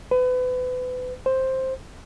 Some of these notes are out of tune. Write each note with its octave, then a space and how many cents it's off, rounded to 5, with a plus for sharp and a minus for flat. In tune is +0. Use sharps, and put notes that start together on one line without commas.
B4 +35
C5 +10